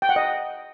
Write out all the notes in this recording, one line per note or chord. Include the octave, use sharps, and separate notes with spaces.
G5
F#5
D#5